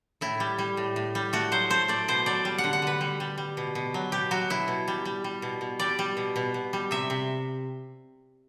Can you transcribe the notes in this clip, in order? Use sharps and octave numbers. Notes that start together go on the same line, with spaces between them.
A2 E4
G3
G3
A2
A2
G3
A3 F#4
F#3 C5
A3 C5
A3 D5
B2 C5
F#3 D5
G3
F#5
D3
F#5
D3 B4
G3
G3
G3
B2
B2
F#3
B2 G4
F#3 F#4
B2 E4
B2
G3
G3
G3
B2
B2
G3 D5
G3
B2
B2
B2
G3
C3 E5
C3